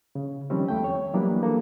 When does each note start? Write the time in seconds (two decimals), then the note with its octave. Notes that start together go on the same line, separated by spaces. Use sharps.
0.15 C#3
0.50 D#3 F3 G3 C4 C#4
0.68 E2 A3 G5
0.84 C#5
1.14 E3 F#3 G3 A#3 B3 D4
1.43 A#3 A4